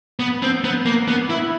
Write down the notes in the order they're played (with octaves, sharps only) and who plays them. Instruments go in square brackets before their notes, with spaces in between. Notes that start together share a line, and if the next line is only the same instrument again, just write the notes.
[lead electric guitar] B3
C4
B3
A#3
B3
E4